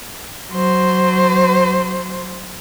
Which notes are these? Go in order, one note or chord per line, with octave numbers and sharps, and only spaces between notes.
F#3 C5